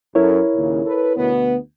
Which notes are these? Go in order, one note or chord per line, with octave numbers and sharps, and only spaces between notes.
F#2 E4 A4 A#4 C#5
D#2 A#2 C#3
A4 B4
D2 B2 B3